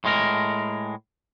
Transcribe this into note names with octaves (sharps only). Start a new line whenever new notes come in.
A2 G#3 A#4